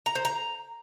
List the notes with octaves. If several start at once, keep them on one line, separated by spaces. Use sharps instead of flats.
A#5
C5
A#5